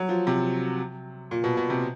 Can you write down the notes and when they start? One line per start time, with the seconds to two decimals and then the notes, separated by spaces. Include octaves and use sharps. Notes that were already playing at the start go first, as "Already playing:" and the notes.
Already playing: F#3
0.09 F3
0.27 C3
1.31 A#2
1.44 B2
1.57 B2
1.70 C3